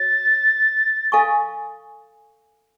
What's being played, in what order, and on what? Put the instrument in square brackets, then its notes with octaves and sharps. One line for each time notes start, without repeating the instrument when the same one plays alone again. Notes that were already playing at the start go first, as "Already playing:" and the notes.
Already playing: [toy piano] F#4 C#5 [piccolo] A6
[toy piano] A4 F5 G#5 C#6